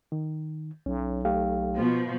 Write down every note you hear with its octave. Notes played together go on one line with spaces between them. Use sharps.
D#3
B1 C#4
A3 G4 F5
B2 F3